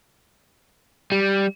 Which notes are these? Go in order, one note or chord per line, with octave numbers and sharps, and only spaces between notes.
G3